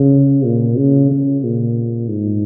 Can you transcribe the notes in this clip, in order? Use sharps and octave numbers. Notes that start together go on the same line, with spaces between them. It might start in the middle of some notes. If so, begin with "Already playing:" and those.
Already playing: C#3
A#2
C#3
C#3
A#2
G#2